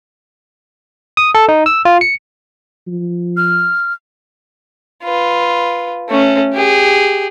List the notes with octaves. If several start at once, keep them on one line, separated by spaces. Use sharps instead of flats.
D#6
A4
D#4
E6
F4
C#7
F3
F6
F4 B4
A3 C#4
G4 G#4